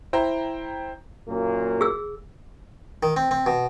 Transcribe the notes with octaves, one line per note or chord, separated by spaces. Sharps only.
E4 C5 G5 A#5
F#2 A#2 A#3
G#4 E6
D#3
C4
C4
B2